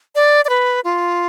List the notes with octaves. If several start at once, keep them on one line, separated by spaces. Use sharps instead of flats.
D5
D5
B4
F4